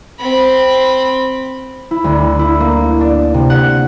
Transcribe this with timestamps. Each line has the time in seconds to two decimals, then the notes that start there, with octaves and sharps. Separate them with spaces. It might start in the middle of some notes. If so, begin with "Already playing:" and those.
0.20 C4 B5
1.91 E4
2.04 D2
2.39 E4
2.60 A#3
3.01 D4
3.34 C3
3.50 F#5